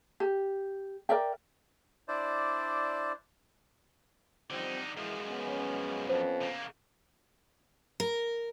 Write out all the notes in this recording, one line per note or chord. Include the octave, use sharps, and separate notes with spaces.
G4
A#4 D5 E5 G5
D4 E4 C5 D5
D3 F3 G3 C4 D#4
F#2 E3 F3 G#3
B3 C#4
F2 C5
C#3 A#3
A#4